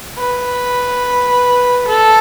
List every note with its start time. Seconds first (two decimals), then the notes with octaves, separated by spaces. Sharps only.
0.18 B4
1.87 A4